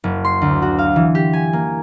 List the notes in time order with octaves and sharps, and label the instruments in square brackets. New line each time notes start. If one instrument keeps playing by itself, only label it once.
[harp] F#1
C6
D2
F#4
F5
E3
G4
G#5
A#3